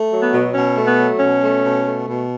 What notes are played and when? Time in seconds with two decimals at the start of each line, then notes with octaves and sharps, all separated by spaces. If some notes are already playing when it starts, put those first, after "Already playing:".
Already playing: A3
0.11 F#3
0.23 B3
0.33 B2
0.55 B2 C#4
0.77 A3
0.87 B3
0.98 F#3
1.20 B2 C#4
1.42 A3
1.64 B2
1.85 A3
2.07 B2